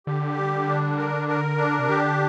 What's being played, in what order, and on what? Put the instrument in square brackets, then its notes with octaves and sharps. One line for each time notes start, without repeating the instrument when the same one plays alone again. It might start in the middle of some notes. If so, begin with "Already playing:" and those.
[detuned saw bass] D3 [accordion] G4
[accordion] G3
D4
A#4
A#4
D4
[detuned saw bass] C3
[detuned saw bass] D3 [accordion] G4